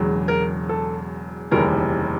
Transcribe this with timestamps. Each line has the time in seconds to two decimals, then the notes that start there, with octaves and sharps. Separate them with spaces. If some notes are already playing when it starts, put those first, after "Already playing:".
Already playing: E1 E2 C#3 F#3
0.28 A#4
0.69 A4
1.51 F1 D#2 C#3 E3 G3 A#4